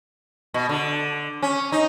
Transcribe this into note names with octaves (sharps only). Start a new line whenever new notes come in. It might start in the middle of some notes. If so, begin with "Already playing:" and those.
B2
D3
C#4
D#4